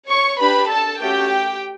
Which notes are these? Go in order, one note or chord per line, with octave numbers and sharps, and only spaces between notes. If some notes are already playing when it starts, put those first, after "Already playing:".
C#5 C#6
D4 G4 B4 B5
A4 A5
A3 C#4 F#4 G4 A4 G5